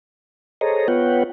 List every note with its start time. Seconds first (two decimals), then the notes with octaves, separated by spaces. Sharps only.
0.61 G#4 A4 C5 C#5 D#5 A#5
0.88 B3 F4 B4 C#5 F#5 G5